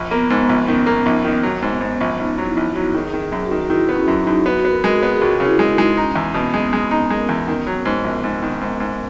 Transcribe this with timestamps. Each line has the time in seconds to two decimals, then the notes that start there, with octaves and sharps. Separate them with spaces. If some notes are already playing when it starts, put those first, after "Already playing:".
Already playing: A#1
0.11 A#3 B3
0.30 G#2 B3
0.49 A#1 B3
0.68 D#3 C#4
0.86 A#3
1.06 A#1 D#4
1.25 D#3
1.43 F#3
1.62 G#2
1.68 B3
1.81 G#2
1.94 C#4
2.01 A#1
2.19 A#1 D#4
2.38 F#3
2.45 E4
2.57 A#1
2.70 F#4
2.76 F#3
2.94 D#3 G#4
3.13 D#3
3.20 G#4
3.32 F#2
3.46 F#4
3.51 D#3
3.62 F#4
3.70 D#3 E4
3.89 B3
3.95 C#4
4.08 F#2
4.20 D#4
4.27 F#2
4.46 B3 F#4
4.65 B3
4.71 A#4
4.84 G#3
4.96 G#4
5.03 B3
5.16 G#4
5.21 C#2 F#4
5.40 C#3
5.46 E4
5.59 G#3
5.72 D#4
5.78 G#3
5.97 C#4 D#4
6.16 E2
6.34 B2 B3
6.54 G#3
6.72 G#3 C#4
6.91 D#4
7.10 G#3 A#4
7.29 E2
7.48 D#3
7.67 F#3
7.85 G#2
8.04 A#1
8.24 G#2
8.42 D#3
8.61 G#2
8.80 G#2